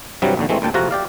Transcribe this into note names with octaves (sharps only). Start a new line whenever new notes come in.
G2 C3 E3 F#3 G3
A#1 D#2 D3
E3 G#3 A3 C4
D2 A#2 G5 A5
F2 C3 F4 F#4 F#5 A#5
G4 D5 F5